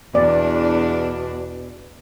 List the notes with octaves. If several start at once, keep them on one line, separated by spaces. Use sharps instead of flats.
E2 B2 D4 D5